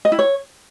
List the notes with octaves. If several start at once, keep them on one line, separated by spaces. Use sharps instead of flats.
D#5
E4
C#5